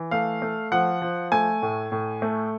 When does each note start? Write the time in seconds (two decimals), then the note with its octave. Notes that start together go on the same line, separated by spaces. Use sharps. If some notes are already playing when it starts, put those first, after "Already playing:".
Already playing: E3
0.11 A3 F5
0.42 A3
0.72 F3 F#5
1.02 F3
1.32 A3 G#5
1.62 A2
1.92 A2
2.22 A3